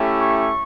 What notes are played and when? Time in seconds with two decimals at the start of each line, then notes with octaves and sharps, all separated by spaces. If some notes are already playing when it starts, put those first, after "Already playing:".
Already playing: A3 C#4 E4 G4
0.19 C#6